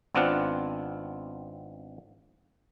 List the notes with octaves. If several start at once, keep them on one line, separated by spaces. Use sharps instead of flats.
G#1 B3 C4 D4 F4 F#5